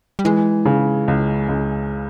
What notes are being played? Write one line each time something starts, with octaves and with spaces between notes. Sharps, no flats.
G3
E3 G#3
C#3
C#2
C#2